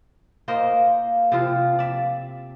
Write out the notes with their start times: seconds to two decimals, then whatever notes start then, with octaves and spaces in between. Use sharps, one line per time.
0.48 A#3 C5 D#5 F5
1.32 C3 F3 F4
1.79 D5 E5